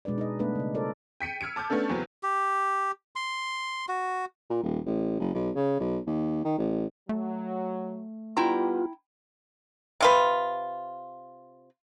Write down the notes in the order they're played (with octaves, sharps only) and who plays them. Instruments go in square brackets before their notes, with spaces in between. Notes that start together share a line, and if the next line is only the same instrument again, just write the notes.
[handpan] B2 G#3 D4 B4 D5
D#4 B4 D#5
G3 A3 B3 D4 B4
C#3 D5
F4 A4 A#4 C5 D5
[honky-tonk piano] G5 B6 C#7 D#7
E6 F6 G#6 C#7 D7
A5 D6 F6 G6 G#6
A3 B3 C#4 D4 A4
E2 C#3 F#3 B3 C4
[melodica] G4
C6
F#4
[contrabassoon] A#2
D#1
A1
F#1
B1
C#3
B1
D#2
D#3
A1
[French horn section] F#3 [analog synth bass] A3
[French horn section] G3 B3 [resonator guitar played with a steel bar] E4 G5 A#5 [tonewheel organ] F4
[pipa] C3 F4 B4